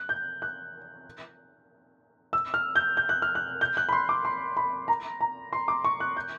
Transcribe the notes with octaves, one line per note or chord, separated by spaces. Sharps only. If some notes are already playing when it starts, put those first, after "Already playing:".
Already playing: F#6
G6
F#6
E6
F6
G6
G6
F#6
F6
F#6
G6
F#6
B5
C6
D6
C6
B5
A#5
A#5
C6
D6
C#6
F#6
G6